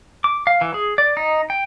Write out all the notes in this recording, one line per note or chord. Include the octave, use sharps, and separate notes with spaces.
D6
F5
E3
G#4
D5
D#4
G5